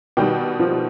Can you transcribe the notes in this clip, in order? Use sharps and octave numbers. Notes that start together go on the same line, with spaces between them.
B2 D#3 G3 G5
F3